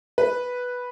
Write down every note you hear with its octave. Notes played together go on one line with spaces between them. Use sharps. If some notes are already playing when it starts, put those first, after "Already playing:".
B4